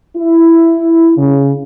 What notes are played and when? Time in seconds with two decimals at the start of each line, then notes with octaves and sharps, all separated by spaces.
0.17 E4
1.17 C#3